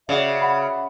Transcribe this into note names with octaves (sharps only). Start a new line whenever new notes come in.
C#3 F#4 G#4 D5 E5
F#5 B5